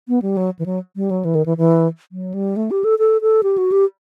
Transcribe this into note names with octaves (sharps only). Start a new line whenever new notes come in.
B3
G3
F#3
E3
F#3
G3
F#3
E3
D#3
E3
E3
F#3
G3
A3
G4
A4
A4
A4
G4
F#4
G4